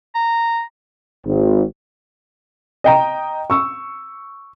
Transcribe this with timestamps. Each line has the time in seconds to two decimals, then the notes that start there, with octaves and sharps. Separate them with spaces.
0.15 A#5
1.25 G#1
2.84 D#5 G5 A#5
3.50 C#6 E6